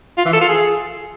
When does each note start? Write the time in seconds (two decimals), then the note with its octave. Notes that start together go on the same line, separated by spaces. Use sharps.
0.18 F4
0.25 E3
0.33 A4
0.41 F4
0.49 G#4